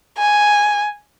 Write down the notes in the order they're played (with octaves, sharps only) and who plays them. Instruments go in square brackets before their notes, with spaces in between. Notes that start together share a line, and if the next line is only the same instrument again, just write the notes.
[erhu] G#5